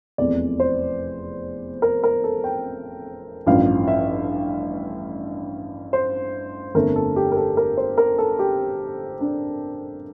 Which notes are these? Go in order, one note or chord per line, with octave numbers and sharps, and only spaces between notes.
F1 E2 C3 D5
C5
A#4
A#4
A4
G5
A1 G2 F3 F5
E5
C5
G1 F2 D3 A3 A#4
A4
G4
A#4
A4
A#4
C5
A#4
A4
G4
D4